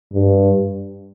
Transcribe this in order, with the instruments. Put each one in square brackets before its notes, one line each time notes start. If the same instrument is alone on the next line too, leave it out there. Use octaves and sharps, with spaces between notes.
[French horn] G2